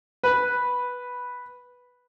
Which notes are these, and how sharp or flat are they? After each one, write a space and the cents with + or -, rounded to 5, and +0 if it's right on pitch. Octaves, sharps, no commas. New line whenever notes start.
B4 -5